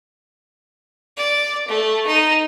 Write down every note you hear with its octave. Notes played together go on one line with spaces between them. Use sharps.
D5
A3
D#4